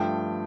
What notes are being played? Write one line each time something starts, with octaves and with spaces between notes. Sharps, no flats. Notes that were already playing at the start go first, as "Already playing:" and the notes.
Already playing: G2 F3 A3 G5